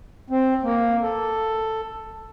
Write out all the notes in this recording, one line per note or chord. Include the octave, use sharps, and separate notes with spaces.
C4
A#3
A4